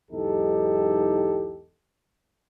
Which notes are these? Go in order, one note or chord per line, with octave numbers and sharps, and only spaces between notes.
B1 E2 G#2 D#4 G4 A4